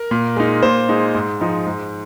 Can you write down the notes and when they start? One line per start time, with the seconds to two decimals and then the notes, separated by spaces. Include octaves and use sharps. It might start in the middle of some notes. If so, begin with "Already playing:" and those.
Already playing: A#4
0.11 A#2
0.36 G#3 D#4
0.63 A#2 C5
0.89 G#3 D#4
1.15 G#2
1.41 F3 G#3 D#4
1.67 G#2